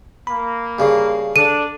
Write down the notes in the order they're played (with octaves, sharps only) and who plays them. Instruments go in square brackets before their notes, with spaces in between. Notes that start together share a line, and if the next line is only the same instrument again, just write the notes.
[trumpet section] A#3 [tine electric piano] B5
[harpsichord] G2 C#3
[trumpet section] D4 [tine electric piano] A4 [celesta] D#7